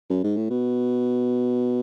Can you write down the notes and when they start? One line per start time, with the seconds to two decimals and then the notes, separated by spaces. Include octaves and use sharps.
0.10 F#2
0.24 G#2
0.37 A2
0.50 B2